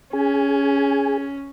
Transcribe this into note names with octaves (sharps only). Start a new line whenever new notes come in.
C#4 G#4